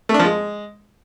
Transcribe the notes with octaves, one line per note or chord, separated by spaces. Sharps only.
A3
D4
F3
G#3